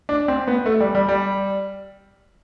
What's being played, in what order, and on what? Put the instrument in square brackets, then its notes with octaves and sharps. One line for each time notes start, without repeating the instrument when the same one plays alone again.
[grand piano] D4
C4
B3
A3
G3
G3
G3